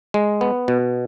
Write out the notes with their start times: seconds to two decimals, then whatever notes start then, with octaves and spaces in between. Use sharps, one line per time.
0.14 G#3
0.41 B3
0.68 B2